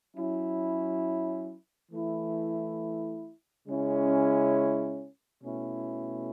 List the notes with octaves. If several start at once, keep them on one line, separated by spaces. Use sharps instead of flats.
F#3 C#4 E4
E3 A3 E4
C#3 G#3 C#4 E4
B2 A3 C#4 E4